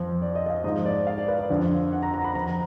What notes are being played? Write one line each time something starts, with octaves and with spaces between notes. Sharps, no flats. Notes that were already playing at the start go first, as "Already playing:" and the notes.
Already playing: F2 F3
D5
D#5
D#5
F5
G#2 F3 D#5
D5
F5
D5
B4
D5
F2 D3 F3 F5
F#5
A#5
A#5
B5
F2 F3 A#5